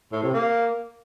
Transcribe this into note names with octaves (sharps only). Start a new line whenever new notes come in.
A2
C3
A#3